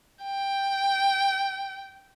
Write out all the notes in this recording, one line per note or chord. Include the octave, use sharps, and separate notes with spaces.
G5